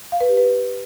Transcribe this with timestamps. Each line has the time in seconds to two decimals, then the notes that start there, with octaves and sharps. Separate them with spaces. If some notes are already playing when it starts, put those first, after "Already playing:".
0.12 F5
0.21 B4
0.29 G4
0.37 B4